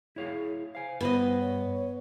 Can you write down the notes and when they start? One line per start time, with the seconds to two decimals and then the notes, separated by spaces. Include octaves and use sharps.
0.16 E4 G#4 C#5 F5
0.75 C5 F5 G#5
1.01 G2 B3 B4 C5 D#5
1.40 C#5